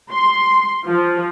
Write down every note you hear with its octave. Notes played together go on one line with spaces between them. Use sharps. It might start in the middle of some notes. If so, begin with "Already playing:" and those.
C6
F3